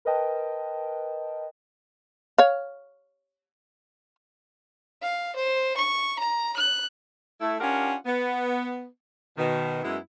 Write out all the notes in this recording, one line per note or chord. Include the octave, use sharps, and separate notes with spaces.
A#4 B4 D#5 G5 A5
C#5 F5
F5
C5
C#6
A#5
F#6
A3 E4
C#4 D4 F4 G4 A#4 F#5
B3
B2 D#3
F#2 G#3 B3 E4